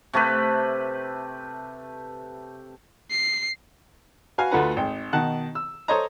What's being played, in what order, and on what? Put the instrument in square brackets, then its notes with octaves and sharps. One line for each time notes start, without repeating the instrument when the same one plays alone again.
[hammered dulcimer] C3 A3 G4 B4
[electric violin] C7
[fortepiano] F#4 B4 F5 G#5
D2 A3 F4 B4 F#5 A#5
G#1 G5
B2 D#3 F#5 A5 F#6
E6
A4 C5 C#5 D#5 A#5